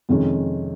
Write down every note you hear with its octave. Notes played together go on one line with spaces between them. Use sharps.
F2 C3 D#3 G#3 C#4